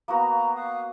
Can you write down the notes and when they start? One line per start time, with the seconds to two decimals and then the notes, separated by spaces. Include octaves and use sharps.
0.08 A#3 B3 F#4 A#5
0.55 F5 D#6 F#6